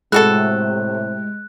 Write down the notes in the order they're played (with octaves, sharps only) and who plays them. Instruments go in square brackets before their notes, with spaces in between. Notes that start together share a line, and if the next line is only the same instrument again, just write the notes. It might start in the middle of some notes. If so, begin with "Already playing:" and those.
[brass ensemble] A2 C3 [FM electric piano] G#3 [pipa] E4 F#4 A4 [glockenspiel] F#6